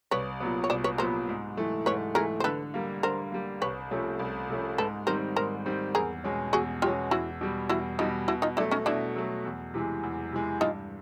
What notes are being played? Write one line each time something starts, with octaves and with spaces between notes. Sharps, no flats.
C2 B4 C#5
A#2 F#3 B3
C#5
C2 C5 D5
B4 C#5
A#2 F#3 B3 A#4 C5
G#2
E3 A3
G#2 B4 C#5
E3 A3 G#4 A#4
C5
D3 A4 B4
G3 A#3
D3 A#4 C5
G3 A#3
C2 B4 C#5
C3 F3 A3 C#4
C2
C3 F3 A3 C#4
G#2 A4 B4
D#3 G3 C4 A#4 C5
G#2 A#4 C5
D#3 G3 C4
E2 G#4 A#4
B2 G#3 C#4
E2 F#4 G#4
B2 G#3 C#4 F4 G4
E2 E4 F#4
B2 G3
E2 E4 F#4
B2 G3 D#4 F4
B2 E4 F#4
D#4 F4
F#3 A3 D4 E4
C#4 D#4
B2 D4 E4
F#3 A3
E2
C3 E3 G#3
E2
C3 E3 G#3
G2 D#4 F4